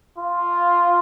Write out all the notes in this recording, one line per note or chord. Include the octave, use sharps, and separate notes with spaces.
F4